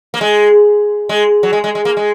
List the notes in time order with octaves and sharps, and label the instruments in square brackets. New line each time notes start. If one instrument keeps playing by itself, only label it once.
[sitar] A#3
G#3
G#3
F#3
G#3
G#3
G#3
A#3
G#3